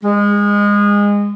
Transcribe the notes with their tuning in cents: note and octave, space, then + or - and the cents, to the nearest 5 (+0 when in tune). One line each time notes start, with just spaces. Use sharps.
G#3 -25